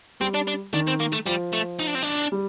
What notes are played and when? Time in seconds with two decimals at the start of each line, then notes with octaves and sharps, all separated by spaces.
0.20 G3 C4
0.34 D4
0.47 D4
0.73 D#3 D4
0.87 C4
1.00 A#3
1.13 A3
1.26 F3 G3
1.53 A3
1.79 D#4
1.87 D4
1.95 C4
2.03 D4
2.32 G3